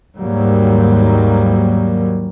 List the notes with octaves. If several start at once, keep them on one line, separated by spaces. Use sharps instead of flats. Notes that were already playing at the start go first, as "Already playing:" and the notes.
D#2 G#2 F#3 G3 A#3